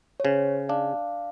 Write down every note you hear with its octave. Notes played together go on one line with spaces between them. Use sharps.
C#5
C#3 C5
D4 F5